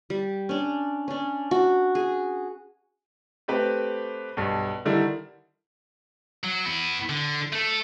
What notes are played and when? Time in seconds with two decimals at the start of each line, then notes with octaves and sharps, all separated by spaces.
0.10 G3
0.49 C#4 D4
1.08 C#4 D4
1.51 F#4
1.95 G#4
3.48 A3 C4 G4 B4
4.37 B1 G2
4.85 D3 D#3 G3 E4
6.44 F#3
6.66 B3 E4
7.09 D3
7.53 A3 A4